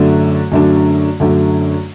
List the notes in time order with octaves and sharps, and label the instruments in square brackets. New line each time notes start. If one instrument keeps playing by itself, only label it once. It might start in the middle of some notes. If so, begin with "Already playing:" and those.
Already playing: [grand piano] F#2 D3 A3 D4
F#2 D3 A3 D4
F#2 D3 A3 D4